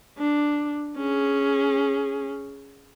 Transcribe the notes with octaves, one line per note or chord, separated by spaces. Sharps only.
D4
C#4 G#4